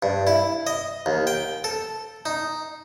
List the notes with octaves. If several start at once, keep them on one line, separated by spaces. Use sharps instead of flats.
G2
E4
D#5
D#2
G5
A4
D#4